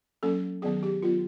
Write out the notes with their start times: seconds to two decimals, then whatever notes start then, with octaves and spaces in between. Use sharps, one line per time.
0.23 F#3 A#3 C#4 A4
0.62 D#3 F#3 B3 G#4
0.83 G4
1.02 D#3 F#3 B3 F4